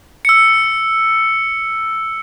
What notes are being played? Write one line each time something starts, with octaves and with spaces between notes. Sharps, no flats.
E6 C#7